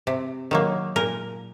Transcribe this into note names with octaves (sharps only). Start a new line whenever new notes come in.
C3
D#3 F#3 A#3
A#2 A#4